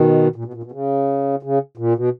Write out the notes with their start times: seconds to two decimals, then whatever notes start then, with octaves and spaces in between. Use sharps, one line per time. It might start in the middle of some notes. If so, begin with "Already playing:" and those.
Already playing: B2 D#3
0.36 A#2
0.45 B2
0.54 A#2
0.63 B2
0.72 C#3
1.43 C#3
1.78 A#2
1.96 B2